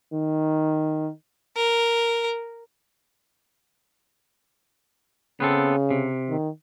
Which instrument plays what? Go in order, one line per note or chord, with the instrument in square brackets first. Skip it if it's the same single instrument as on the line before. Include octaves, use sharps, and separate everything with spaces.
[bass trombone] D#3
[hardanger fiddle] A#4
[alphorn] C#3 [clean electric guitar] B3 C4 A4
[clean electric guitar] C3
[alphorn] D#3